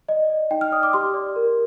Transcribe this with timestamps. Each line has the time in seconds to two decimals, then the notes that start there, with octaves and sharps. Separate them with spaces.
0.09 D5 D#5
0.30 D5
0.51 D#4 G5
0.61 F6
0.72 D5 D#6
0.83 D6
0.93 G4 C6
1.14 D5
1.36 A#4